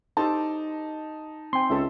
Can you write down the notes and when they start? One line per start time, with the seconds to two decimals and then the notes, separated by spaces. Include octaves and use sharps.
0.17 D#4 G4 A4 C5 A5
1.53 C4 G5 G#5 C6
1.70 C#2 A4 C#5 E5